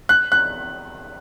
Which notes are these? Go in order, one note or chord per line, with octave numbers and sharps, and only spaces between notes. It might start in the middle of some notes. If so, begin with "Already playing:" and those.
F#6
F#6